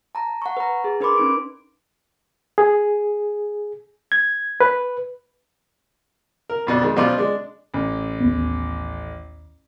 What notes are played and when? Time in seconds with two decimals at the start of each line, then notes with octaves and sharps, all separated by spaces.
0.15 A5 A#5
0.42 F#5 C#6
0.57 B4 A#5
0.84 G#4
1.00 D4 A#4 B4 B5 C6 D6
1.17 C#4 D#4 D7
2.58 G#4
4.12 G#6
4.61 B4
6.50 A#4
6.67 F2 B2 D4
6.82 D#3 G#3
6.96 B2 F3 F4 C5 D5 C6
7.18 G#3 D4
7.74 A1
8.20 D#2 B3